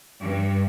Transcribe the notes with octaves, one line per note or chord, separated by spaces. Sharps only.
G2